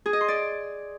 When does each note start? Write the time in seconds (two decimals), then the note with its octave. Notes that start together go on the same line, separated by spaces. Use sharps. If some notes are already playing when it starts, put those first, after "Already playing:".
0.06 G#4
0.13 D#5
0.21 C6
0.28 D5